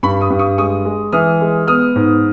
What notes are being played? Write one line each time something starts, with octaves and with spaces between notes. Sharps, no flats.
G2 B5 C#6
C#6 D#6
G2
C#6 D#6
G#3 C#6 D#6
G#3
E3 D#6 F6
G#3
B3 D#6 F6
G#2